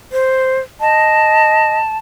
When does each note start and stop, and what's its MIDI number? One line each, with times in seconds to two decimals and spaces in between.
0.12 0.60 72
0.81 1.78 75
0.81 1.97 81